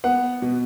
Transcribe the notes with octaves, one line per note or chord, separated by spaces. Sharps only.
B3 F#5
B2